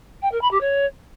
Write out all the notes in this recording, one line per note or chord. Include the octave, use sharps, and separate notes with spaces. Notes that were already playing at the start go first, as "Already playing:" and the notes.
G5
A#4
B5
G4
C#5